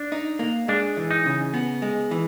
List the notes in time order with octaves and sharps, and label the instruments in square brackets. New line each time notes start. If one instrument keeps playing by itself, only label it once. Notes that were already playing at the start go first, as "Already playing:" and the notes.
Already playing: [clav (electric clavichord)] D4
[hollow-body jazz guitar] D#4
A#3
[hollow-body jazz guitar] G#3 [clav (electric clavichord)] D4
[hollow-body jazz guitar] E3
[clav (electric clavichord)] D#4
[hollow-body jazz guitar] C#3
B3
G#3
E3